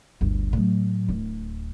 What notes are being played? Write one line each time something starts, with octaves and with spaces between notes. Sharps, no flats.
G1 D2
A2 F#3
D1